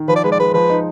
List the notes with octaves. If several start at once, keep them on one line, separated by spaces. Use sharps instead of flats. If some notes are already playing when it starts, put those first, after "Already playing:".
Already playing: D#3
F3 B4
D5
G#3 B4
D5
G#3 B4
F3 B4
D#4